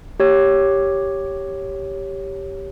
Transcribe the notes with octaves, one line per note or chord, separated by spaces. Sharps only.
G4 C#5